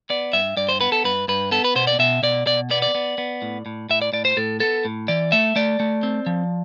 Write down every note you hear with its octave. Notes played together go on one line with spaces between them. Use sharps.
B3 D5
G2 E5
G2 D5
C5
B3 B4
A4
G2 B4
G2 B4
B3 A4
B4
B2 C5
D5
B2 E5
B2 D5
B2 D5
B3 D5
D5
B3
B3
A2
A2
A2 E5
D5
A2 D5
C5
A2 A4
B3 A4
A2
E3 D5
A3 E5
A3 D5
A3
C4
F3